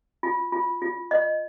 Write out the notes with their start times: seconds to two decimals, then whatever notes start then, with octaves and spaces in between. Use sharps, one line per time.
0.23 F4
0.52 F4
0.82 F4
1.11 D#5